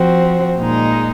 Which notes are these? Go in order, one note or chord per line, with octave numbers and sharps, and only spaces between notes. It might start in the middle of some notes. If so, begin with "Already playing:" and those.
Already playing: F3 C4 F#4
A#2 G#3 D#4